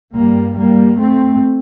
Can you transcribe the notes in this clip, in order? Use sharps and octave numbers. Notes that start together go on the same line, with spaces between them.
G2 G3 A#3
G3 A#3
A3 C4